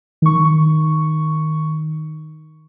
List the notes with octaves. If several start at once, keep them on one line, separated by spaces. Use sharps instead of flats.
D#3 C#6